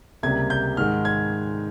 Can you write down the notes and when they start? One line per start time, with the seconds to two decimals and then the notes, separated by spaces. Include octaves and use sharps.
0.23 C#2 C3 G3 A#3 G#6
0.50 G6
0.77 G#2 D#3 G#3 F6
1.05 G#6